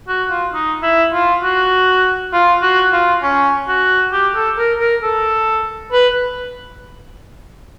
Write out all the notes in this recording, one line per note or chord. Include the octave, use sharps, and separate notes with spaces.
F#4
F4
D#4
E4
F4
F#4
F4
F#4
F4
C#4
F#4
G4
A4
A#4
A#4
A4
B4